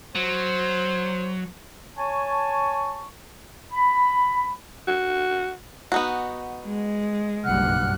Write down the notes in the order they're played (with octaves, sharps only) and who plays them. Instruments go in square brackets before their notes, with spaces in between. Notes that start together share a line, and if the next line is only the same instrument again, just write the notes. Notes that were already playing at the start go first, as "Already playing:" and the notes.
[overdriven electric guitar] F#3 [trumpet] C5
[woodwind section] C#5 G#5 A5 C#6
B5
[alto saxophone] F#4
[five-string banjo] B3 D#4 F#4
[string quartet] G#3
[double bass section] F#1 B1 G2 [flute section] F#5 F6 F#6